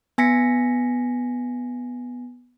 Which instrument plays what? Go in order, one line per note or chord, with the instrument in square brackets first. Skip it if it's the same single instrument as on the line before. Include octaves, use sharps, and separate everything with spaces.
[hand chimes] B3 G#5 A#6 B6 C#7